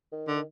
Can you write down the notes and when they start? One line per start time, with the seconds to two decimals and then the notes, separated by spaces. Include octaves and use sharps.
0.12 D#3
0.28 D3
0.36 D#3